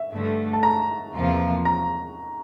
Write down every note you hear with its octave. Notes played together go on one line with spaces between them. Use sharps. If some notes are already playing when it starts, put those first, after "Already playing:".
Already playing: E5
G2 D3 A3
A5
A#5
E2 C3 F3 A#3 F4
A#5